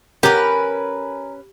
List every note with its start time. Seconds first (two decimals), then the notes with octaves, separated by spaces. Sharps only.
0.23 C#4 G4 A#4 B4